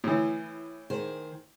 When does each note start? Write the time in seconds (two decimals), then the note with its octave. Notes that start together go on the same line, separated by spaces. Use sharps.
0.04 A2 E3
0.90 D#3 G#4 C5